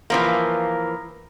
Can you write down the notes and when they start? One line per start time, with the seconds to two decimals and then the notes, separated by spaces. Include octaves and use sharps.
0.10 E3 F3 A#3